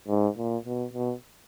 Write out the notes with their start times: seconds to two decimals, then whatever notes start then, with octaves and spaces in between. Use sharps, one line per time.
0.08 G#2
0.37 A#2
0.65 B2
0.93 B2